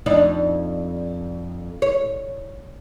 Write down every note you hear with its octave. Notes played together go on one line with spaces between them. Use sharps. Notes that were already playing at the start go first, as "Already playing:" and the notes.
F2 D4 D#4
C#5